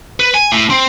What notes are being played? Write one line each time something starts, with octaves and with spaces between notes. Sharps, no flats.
B4
G#5
A2
C4